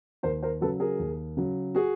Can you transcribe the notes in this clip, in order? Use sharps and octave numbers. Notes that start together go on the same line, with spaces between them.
D#2 A#4 C5
A#4 C5
C#3 F#3 A4 B4
G#4 A#4
D#2
C#3 F#3
F#4 G#4